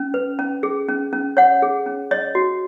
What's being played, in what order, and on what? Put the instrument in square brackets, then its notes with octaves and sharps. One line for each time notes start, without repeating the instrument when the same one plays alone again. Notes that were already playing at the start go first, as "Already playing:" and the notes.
Already playing: [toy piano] C#4
B4
C#4
G#4
C#4
C#4
C#5 F#5
G#4
C#4
C#5 D#5
F#4